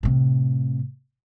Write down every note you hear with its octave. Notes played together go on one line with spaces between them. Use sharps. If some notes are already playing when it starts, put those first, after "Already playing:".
A2 C3